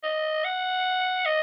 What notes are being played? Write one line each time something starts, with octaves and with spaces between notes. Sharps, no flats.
D#5
F#5
D#5